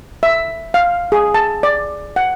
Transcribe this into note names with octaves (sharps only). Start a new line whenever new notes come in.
E5
F5
G#4
A5
D5
F#5